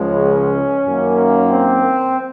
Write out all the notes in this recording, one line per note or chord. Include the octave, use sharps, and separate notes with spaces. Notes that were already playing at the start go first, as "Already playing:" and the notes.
Already playing: C#2 C#3 F3 G#3 C#4
F#2 D#3 A#3
C4